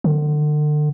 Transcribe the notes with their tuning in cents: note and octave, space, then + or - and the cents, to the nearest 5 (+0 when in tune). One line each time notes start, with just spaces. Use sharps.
D3 +35